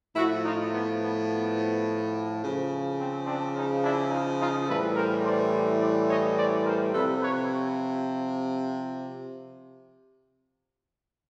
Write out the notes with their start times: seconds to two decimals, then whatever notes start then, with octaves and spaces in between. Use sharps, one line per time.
0.16 A2 F3 E4 F#4
0.44 D#4 F4
0.72 B3
1.00 B3
1.29 B3
2.42 C#3 F3
2.98 C4
3.26 C4 D4
3.55 C#4 D#4
3.82 D4 E4
4.10 D#4 F4
4.39 D#4 F4
4.67 A2 E3 G3 A4 B4
4.96 A#4 C5
5.24 C5 D5
5.80 C5 D5
6.09 C#5 D#5
6.37 C5 D5
6.65 A#4 C5
6.93 C3 F3 A4 B4
7.21 B4 C#5